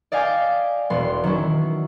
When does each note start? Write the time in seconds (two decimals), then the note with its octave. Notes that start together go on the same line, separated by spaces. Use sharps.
0.12 D5 D#5 F5 G5 G#5 D6
0.90 E1 B3 C6
1.24 D#3 F#3 C#4 E4